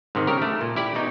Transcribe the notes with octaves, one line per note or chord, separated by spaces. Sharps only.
G#2 C3 D#3
C#3 G4 A#4
A3
A#2
E4 G4 D5
B2 D#4